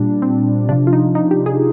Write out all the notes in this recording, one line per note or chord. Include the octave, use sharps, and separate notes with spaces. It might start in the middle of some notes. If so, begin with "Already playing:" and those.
Already playing: A#2 G3 D4
C4
C3 F3 D4
F4
D#4
D#4
G4
G#4